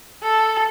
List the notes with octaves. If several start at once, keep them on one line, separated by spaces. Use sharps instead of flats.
A4